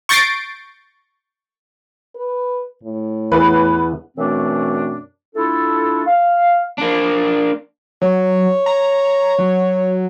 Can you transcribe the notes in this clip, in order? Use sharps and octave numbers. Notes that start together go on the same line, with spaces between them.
C#6 G6 A6 A#6 C7 D7
B4
A2
E2 E3 B3 B4
F#2 B2 E3 A3 C4 D4
A3 D4 E4 F4 A4
F5
A#3 D4
F#3 C#5
A#5
F#3